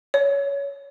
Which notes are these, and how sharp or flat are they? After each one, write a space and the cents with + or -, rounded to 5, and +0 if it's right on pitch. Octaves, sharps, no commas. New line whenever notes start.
C#5 +15